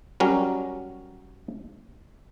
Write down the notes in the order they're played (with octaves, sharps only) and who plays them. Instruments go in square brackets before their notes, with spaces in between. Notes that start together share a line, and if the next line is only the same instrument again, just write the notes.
[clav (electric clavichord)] F#3 G3 C#4 A#4